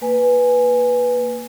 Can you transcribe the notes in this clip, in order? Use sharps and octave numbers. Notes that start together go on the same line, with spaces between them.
A#3 B4 G#5